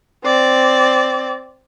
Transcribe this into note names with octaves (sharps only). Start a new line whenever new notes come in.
C4 D5